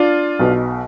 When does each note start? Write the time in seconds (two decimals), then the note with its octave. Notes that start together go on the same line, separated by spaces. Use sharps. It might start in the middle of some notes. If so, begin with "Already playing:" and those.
Already playing: D4 F4
0.39 B1 B2